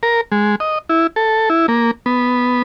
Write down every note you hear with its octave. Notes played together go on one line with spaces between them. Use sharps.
A#4
G#3
D#5
E4
A4
E4
A#3
B3